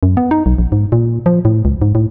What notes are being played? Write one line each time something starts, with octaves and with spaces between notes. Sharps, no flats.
F#2
B3
D#4
B1
A#1
G#2
A#2
F3
A2
C#2
G#2
A2